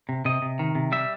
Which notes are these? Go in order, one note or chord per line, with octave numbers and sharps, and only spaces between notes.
C3
C3 D#5
C3
D#3
C3
G3 E5